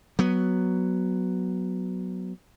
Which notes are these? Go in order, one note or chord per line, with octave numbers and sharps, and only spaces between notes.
F#3 B3